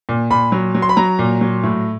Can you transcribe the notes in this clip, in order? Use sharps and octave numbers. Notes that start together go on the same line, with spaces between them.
A#2
A#2 B5
F#3
F#3
C6
B5
F#3 A#5
A#2
F#3
A2